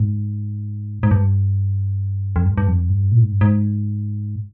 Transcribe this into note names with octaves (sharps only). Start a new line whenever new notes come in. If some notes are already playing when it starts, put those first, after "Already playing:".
Already playing: G#2
G#2
G2
F2
G2
G2
F2
G2
A#2
G#2
G2
G#2